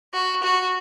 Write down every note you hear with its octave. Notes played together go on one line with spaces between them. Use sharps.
F#4
F#4